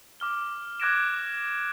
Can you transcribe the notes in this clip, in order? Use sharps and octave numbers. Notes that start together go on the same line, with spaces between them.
D6 F6 G7
D6 F#6 G#6 A#6 D7 E7